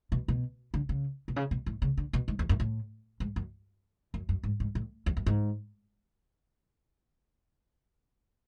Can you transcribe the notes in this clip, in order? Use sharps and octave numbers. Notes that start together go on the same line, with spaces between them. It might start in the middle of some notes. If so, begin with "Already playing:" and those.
B2
B2
D3
C#3
B2
C#3
B2
A2
C#3
D3
B2
G#2
E2
F#2
A2
G#2
F#2
F#2
F#2
G#2
G#2
A2
E2
F#2
G#2